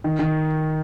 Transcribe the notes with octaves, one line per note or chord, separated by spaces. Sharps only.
D#3
D#3